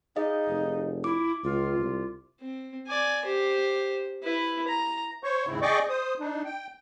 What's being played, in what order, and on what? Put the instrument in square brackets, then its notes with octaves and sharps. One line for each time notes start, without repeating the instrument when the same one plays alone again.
[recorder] D#4 [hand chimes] G#4 D#5 F5
[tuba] F1
[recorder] E4 [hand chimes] D6
[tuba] C#2 [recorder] F4
[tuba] C2
[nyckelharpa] C4
D5 G#5
G4 C5
E4 B4
A#5
[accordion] C5 C#5 C#6
D#2 G#2 C#3 C4 E4
G#4 D5 D#5 G5 C#6 D6
C5 D#6
D4 D#4
G5